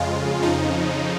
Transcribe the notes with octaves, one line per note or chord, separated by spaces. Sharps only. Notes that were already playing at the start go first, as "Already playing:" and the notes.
Already playing: F2 C#3 G#3 F4
F2 C#3 F3 D#4